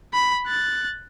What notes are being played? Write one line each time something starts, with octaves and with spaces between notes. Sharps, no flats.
B5
F#6 A6